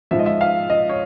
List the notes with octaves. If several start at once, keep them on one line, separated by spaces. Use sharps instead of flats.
G#2 F3 E5
D#5
E5
F5
D#5
C#5